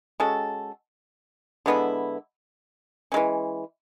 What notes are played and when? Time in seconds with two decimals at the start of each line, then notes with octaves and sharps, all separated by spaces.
0.20 G#3 C#4 F#4 A4
1.66 D3 G#3 B3 E4
3.12 E3 G#3 C#4